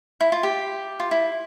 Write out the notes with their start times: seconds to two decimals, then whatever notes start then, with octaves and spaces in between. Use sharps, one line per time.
0.21 E4
0.32 F4
0.43 G4
1.00 F4
1.11 E4